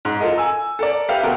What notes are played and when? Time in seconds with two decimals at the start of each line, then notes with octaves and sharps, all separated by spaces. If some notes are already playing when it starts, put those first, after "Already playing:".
0.05 G#2
0.20 F4 A4 A#4 D#5
0.38 G#5 E6
0.79 A4 A#4 D5
1.09 G4 A4 B4 E5 F5
1.23 D2 B2 A#4